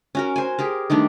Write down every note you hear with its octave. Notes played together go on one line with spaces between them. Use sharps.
C#4 F#4 A#4
C5 G#5
G4 G#4 A#4
D#3 G3 A3 D4